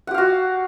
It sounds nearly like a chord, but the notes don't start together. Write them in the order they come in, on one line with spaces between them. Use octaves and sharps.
F#5 G4 F5 F#4